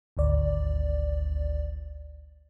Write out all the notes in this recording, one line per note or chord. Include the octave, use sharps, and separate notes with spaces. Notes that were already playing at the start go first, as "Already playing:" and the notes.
G#1 D2 D5